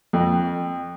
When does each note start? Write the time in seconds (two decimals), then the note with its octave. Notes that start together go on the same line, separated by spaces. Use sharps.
0.13 F2